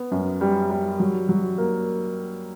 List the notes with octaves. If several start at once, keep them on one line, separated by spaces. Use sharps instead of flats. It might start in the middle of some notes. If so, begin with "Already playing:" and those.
Already playing: B3
F#2
G3
G3
F#3
F#3
A#3